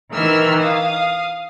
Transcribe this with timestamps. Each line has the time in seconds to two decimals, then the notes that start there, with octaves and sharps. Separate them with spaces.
0.11 D#3 E3 E6 F6
0.60 F5 D#6